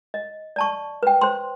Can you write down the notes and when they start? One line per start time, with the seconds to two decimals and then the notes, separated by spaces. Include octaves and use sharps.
0.14 D#5
0.56 D5 A5 C#6
1.03 B4 G5
1.22 C5 C6